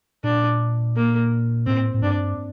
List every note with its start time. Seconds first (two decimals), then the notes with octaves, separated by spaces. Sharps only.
0.24 A#2 D4
0.96 A#3
1.66 A2 C4
1.94 A2
2.02 G2 D4